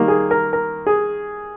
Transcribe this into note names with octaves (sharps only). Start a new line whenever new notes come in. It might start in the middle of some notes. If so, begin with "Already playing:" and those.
Already playing: D#3 G3 A#3
G#4
A#4
A#4
G#4